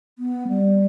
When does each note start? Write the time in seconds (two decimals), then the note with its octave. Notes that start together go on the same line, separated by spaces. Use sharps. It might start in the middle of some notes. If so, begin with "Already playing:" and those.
0.19 B3
0.48 G3